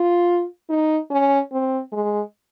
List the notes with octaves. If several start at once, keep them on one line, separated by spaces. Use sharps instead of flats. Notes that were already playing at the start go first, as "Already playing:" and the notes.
Already playing: F4
D#4
C#4
C4
G#3